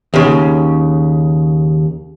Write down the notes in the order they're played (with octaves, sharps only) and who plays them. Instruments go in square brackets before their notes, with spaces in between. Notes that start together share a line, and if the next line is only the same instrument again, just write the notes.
[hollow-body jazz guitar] D#2 C#3